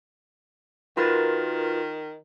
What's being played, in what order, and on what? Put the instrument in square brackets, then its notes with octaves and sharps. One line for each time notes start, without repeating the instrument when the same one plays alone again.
[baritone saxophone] D#3 [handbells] F4 A#4 A6 [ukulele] F#4 B4